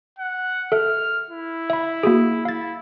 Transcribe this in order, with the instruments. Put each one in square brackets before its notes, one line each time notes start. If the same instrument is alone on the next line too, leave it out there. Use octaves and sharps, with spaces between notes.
[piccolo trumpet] F#5
[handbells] A4 E5 [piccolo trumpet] F6
[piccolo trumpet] E4
[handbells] E5 B5
A#3 F#4 G#4
[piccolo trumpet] E4 [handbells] F5 A6